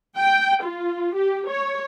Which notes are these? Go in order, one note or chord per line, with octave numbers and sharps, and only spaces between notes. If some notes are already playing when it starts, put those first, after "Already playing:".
G5
F4
G4
C#5